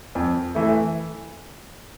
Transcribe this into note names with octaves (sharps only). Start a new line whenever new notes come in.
F2
E3 A3